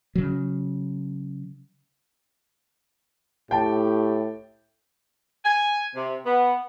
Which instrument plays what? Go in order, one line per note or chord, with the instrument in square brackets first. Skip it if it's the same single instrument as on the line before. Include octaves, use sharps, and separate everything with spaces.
[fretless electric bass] C#3 F#3
[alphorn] A2 [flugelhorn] G4 [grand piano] G5 A5
[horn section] G#5
C3
B3